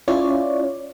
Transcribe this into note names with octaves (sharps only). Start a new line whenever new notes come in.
C#4 E4 F4 C#5 D5